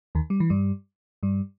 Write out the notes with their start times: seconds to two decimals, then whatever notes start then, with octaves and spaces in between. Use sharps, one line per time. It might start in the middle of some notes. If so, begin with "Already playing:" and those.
0.15 D#2 D#3
0.30 G3
0.40 E3
0.50 G2 G3
1.23 G2 G3